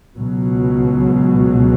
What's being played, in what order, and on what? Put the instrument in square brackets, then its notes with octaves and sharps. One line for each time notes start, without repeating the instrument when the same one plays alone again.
[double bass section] C#2 B2 F#3